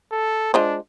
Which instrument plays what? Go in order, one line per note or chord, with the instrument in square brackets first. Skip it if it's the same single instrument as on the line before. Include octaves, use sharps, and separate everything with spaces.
[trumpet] A4
[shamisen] G#3 F4 C5 [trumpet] D4